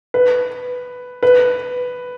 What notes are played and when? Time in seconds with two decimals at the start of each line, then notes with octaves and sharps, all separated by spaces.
0.14 B4
1.23 B4